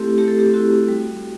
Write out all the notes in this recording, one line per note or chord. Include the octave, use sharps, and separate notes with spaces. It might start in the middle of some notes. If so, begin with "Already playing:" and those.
Already playing: A3 C4 E4 G4 A4
A3 G4
A4
G4
C4 E4 F#4
G3